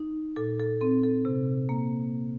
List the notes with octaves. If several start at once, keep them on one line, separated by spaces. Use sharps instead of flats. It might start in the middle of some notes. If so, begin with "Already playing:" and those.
Already playing: D#4
A#2 A4
A4
C4 A4
A4
C3
A#3